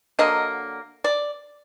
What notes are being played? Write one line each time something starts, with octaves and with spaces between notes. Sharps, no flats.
D3 F#3 A#3 D#5
D5